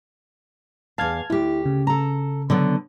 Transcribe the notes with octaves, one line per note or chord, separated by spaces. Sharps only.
E2 F5 A5 F6 G#6
D2 E4 G4
C#3
A4 A#5
D3 F#3 B3